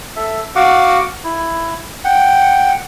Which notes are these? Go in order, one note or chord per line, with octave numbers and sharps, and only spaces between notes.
A4 E5
F#4 F5 F#5 D6
E4
F#5 G5